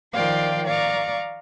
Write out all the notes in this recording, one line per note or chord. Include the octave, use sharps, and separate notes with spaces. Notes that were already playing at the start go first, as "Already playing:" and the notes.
D#3 F3 D5 F5 G5 C6
D5 F5 A#5 C#6